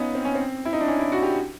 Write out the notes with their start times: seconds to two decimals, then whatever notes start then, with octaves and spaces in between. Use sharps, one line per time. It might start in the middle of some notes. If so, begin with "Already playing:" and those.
Already playing: B3 C#4 D#4 F4
0.15 C4
0.25 C#4
0.35 C4
0.65 E4
0.73 D#4
0.80 D4
0.87 C#4
0.99 E4
1.12 F#4
1.23 G4